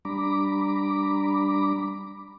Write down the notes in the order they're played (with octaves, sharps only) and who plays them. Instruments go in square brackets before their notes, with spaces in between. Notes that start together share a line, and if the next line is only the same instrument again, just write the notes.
[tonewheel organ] G3 D4 A#5 B5 D6